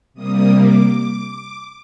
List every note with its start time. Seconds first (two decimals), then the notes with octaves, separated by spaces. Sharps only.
0.14 C3 G3 A#3 D#6
0.53 D6